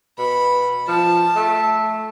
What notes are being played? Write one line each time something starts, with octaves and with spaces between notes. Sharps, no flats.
B2 B5
F3 A5
A3